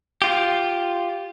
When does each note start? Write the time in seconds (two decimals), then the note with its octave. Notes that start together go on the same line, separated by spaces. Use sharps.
0.22 F4 G4